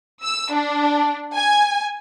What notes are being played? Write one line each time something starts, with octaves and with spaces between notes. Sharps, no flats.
E6
D4
G#5